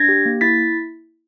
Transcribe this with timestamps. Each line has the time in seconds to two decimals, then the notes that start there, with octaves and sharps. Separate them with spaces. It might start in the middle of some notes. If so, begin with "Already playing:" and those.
Already playing: D4 G#6 A#6
0.09 G4
0.26 A#3
0.41 E4 A6 B6